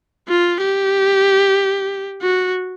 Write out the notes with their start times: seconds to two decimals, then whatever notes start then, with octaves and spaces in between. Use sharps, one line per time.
0.28 F4
0.61 G4
2.22 F#4